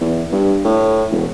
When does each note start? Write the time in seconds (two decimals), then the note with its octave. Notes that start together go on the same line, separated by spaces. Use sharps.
0.01 E2
0.32 G2
0.65 A2
1.11 E1